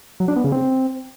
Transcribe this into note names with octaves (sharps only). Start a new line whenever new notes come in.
F#3
D4
B3
C#3
C4